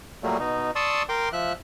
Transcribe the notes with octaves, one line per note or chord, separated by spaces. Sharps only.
A#2 F#3 G3 A3 A#3
B2 D#4
D5 A5 C6 C#6 D#6 E6
A#4 G5 C6 D6
F3 E5 F#6